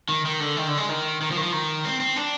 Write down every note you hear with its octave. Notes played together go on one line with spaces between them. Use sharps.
D#3
D#3
D3
D#3
D3
G#3
D#3
D#3
F3
D#3
F3
D#3
C4
C4
D4